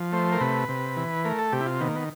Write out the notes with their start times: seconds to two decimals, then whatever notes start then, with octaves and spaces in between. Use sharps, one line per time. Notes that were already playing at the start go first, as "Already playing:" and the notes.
Already playing: F3
0.12 A3 C5
0.32 A#4
0.41 C3 B4
0.69 C3
0.97 E3
1.24 A3 A#4
1.39 A4
1.52 C3 G4
1.60 E4
1.66 F4
1.80 D#3 B3
1.88 A#3
1.96 B3